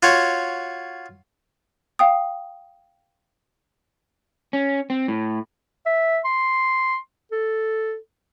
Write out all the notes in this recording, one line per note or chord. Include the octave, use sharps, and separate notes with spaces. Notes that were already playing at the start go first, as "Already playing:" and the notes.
F4 F#4 C#5
F5 G5 D#6
C#4
C4
A2
E5
C6
A4